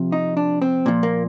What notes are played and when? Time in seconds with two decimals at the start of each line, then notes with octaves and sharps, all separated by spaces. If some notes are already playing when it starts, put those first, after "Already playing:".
Already playing: C3 F3
0.12 D#4
0.37 D4
0.62 C4
0.86 A#2 F3
1.03 A#3